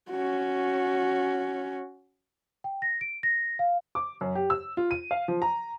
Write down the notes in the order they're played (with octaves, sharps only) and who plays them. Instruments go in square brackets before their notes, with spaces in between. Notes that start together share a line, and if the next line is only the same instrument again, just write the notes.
[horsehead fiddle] C#4 F#4
[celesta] G5
A#6
D7
A#6
F5
[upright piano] D6
F#2
G4
E6
F4
D#7
F5
F3
A#5